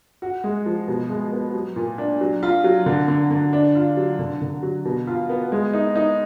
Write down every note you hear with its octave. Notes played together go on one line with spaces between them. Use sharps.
F#4
G#3
F3
B2
G#3
B3
F#3
A#2
D4
F#3
F4
F#3
D3
D3
D3
D4
F4
F#3
D3
D3
F#3
B2
F4
B3
G#3
D#4
D#4